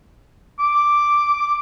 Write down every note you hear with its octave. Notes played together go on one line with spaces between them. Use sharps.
D6